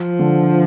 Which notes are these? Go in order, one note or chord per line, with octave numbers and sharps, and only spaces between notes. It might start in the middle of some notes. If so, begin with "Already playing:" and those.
Already playing: F3
D3